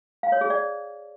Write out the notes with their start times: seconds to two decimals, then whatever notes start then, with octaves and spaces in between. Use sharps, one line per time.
0.23 F5
0.32 C#5
0.41 G#4
0.50 D5